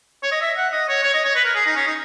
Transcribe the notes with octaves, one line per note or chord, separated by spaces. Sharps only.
C#5
D#5
E5
F#5
D#5
C#5
C#5
D#5
C#5
B4
A#4
G#4
D#4
C#4
D#4